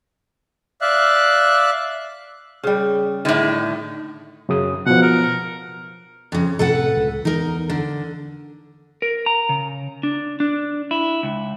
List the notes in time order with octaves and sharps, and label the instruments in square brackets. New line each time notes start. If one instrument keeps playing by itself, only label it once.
[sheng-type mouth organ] D5 E5 F5 F#6
[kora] C#3 G3
[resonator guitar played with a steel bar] A2 D3 [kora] D#3
[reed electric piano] F#2 C#3 D#6
[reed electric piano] B2 F3 [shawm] F#5
[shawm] A#4
[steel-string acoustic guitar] F2 C#3
[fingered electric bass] A2 C3 [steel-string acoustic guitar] A4 B4 F#5
[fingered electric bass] C#2
[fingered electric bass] E2 E3 [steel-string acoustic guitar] D#4 A#4
[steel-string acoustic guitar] D3
[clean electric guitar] A#4
A#5
C#3
D4
D4
E4
C#2